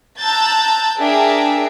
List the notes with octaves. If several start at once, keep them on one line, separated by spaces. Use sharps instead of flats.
A5 A#5 E6 F#6 G6 A6
D4 G#4 A#4 E5 G5